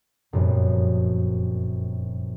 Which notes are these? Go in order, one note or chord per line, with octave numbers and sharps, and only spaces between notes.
F1 F#2 A#2 G3 B3 A#4